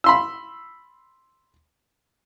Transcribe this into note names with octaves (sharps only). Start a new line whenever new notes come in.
B5 C6 E6